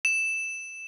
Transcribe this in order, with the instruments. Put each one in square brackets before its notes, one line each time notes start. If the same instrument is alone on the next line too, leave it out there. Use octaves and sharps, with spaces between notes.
[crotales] E7